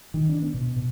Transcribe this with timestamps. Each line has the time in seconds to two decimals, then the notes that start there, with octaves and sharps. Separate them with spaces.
0.14 D#3
0.29 D4
0.42 B3
0.54 B2
0.76 B2